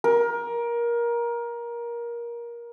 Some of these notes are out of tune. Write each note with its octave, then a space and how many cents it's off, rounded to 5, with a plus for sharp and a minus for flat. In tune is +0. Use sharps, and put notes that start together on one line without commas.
A#4 +20